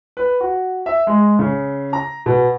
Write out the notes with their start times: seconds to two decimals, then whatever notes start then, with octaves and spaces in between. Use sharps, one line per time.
0.17 B4
0.40 F#4
0.86 E5
1.07 G#3
1.39 C#3
1.93 A#5
2.26 B2